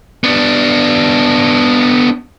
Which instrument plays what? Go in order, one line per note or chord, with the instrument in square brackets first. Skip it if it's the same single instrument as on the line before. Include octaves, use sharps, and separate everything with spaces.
[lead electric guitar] B3 D4